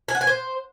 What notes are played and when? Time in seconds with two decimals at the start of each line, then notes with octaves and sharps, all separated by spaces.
0.08 G#5
0.15 F#5
0.21 G#5
0.27 C5